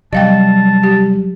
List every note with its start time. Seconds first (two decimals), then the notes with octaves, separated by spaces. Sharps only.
0.13 C3 F#3 G3 D#5 F5 G5 A5
0.84 G4